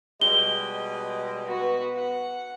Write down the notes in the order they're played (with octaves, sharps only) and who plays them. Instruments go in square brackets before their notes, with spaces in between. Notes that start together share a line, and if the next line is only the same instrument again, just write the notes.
[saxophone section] B2 G3 G#3 [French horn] D#5 [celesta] G7
[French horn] B3 [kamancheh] F#4 B4
[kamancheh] F#5